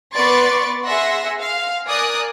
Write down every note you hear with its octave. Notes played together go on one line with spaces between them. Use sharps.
B3 B4 D5 C6 C#6 A6
G#4 E5 F#5 C6 E6 A#6
F5
A#4 D5 G#5 D#6 F#6